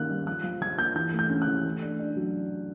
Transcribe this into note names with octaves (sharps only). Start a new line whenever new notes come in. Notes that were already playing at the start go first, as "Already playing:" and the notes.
Already playing: D#3 A#3 C#4 F#6
G3
F3 F#6
F3
F3 G#6
A#3 G6
E3 G6
A3
G6
C#4
F#6
E3
A3
D4
D4
F#3